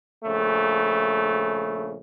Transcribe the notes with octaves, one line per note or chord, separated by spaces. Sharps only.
A#1 C#3 A3